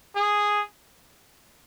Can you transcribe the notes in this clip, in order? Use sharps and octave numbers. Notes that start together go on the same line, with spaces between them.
G#4